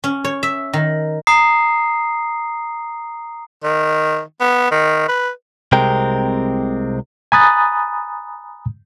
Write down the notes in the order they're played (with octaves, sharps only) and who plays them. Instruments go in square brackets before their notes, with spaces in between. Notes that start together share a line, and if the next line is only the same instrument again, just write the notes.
[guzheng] C#4
C#5
E5
D#3
[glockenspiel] A#5 D#6 C7
[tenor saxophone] D#3
B3
D#3
B4
[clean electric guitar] C2 C3 G#3 C4 A#4 G5
[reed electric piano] G#5 A#5 B5 D#6 F#6 A6